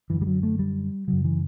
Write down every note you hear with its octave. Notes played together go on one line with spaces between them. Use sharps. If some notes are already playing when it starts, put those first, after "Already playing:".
F#2 D3 E3
G3
F#3
A3
G3
F#2 C#3 F#3
E3